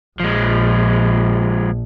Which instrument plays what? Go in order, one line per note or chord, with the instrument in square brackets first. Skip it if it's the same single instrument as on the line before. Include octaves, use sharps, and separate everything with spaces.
[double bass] A#1 [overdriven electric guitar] F3 G#3